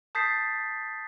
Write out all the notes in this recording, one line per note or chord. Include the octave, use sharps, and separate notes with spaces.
A5 D#6 G6 A6 B6 C7